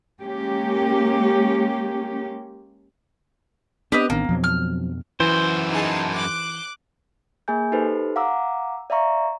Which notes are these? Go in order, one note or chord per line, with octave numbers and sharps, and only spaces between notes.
G#3 A#3 C#4 G4
B3 C4 D4 G4 B4 D#5
A1 D#3 A#3 D4
F2 B2 F3 F#3 C4
F6
F#2 E3 E4 C5
D#4 G#4 A5
D6 F#6
A#3 G#4 G#5 G6
D#4 G4 A4 B4 C5
F5 F#5 A#5 D6 E6
D5 E5 F5 A#5 C#6